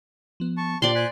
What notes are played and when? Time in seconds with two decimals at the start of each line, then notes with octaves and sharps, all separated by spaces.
0.40 F3 B3
0.57 A5 C#6
0.82 A#2 D4 G4 C5 D5 C6
0.95 C5 G#5 F#6 B6